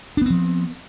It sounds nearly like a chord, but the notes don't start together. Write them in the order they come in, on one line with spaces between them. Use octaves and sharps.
D4 B3 C4 F3